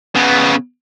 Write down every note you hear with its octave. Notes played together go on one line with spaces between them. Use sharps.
C#3 B3